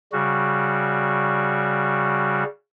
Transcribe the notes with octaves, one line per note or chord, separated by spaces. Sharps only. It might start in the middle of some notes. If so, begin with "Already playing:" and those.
C#3 G3 F#4